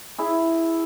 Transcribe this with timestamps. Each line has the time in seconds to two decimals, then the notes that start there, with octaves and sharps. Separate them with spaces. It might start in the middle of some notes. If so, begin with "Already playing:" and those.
0.18 E4 G#4